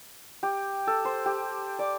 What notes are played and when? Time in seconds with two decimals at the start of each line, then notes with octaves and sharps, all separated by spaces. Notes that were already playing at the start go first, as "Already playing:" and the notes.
0.43 G4
0.87 A4
1.05 C5
1.26 G4
1.79 D5